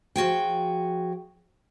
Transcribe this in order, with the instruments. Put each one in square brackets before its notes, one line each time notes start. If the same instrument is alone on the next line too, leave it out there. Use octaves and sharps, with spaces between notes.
[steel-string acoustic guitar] F3 F#4 G#4 G5